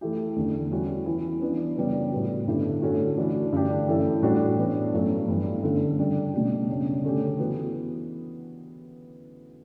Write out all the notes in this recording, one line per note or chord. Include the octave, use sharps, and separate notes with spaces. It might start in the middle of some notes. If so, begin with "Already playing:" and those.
E3 A3 E4 G4
E2 D3 A3
E3 G3 C#4 F#4
E3 B3 E4
E3 B3 D4
F#2 C#3 G3 B3 D4
A2 G3 B3 F#4
G2 D3 A3 E4 G4
D3 A3 C#4 F#4
E3 A3 D4 F#4
G2 D3 A3 D4 G4
F#2 E3 A3 E4 G4
A2 G3 D4 F#4
E3 B3 D4
G2 F#3 A3 C#4
G2 E3 G3 B3
F#2 D3 A3
C#3 G3 D4
B2 G3 D4 G4
F#2 C#3 G3 D4
D3 A3 C#4 G4
E3 B3 F#4